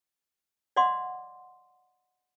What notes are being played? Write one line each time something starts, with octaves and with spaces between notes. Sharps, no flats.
D5 D#5 F#5 C6 D6